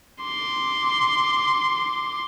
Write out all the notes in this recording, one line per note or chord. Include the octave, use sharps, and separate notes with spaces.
C6 D6